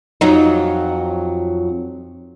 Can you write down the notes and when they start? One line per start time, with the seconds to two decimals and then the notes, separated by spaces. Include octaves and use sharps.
0.21 F2 F#3 D#4